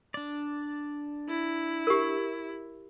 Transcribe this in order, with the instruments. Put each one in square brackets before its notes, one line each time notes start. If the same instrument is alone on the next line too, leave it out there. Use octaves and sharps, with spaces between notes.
[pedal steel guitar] D4 D5
[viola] E4
[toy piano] G4 A#4